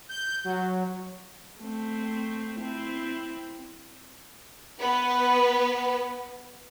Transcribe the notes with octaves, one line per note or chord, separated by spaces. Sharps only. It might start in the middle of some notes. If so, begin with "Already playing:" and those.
G6
F#3
A3 C4
C4 E4
B3 B4